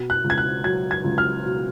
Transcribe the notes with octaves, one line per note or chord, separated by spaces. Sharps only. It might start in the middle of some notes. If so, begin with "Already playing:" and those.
Already playing: B2
F#6
C#2
G#6
F#6
F#3 G#6
G#6
C#2
F6
B2